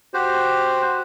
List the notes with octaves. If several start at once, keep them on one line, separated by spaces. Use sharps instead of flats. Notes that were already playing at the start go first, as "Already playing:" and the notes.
F#4 G4 C5